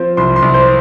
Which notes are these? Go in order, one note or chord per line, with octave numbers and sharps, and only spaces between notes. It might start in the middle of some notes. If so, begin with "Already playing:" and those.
Already playing: F3 C4
C2 C6
C6
C2
C5